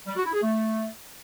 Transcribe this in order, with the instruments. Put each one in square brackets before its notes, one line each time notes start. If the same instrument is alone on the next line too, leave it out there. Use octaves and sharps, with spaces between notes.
[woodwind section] G3
F#4
E4
G#4
A3